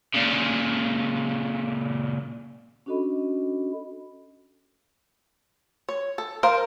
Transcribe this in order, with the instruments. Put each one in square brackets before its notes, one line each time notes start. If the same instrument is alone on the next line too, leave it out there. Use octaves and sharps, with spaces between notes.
[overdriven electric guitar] A#2 C#3
[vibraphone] C#4 D4 F#4 A4 D#5 B5
[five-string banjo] C#5
A4
A#4 C5 F5